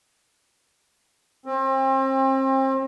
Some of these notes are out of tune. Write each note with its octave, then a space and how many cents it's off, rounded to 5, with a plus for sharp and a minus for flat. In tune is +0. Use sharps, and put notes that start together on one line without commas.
C4 +35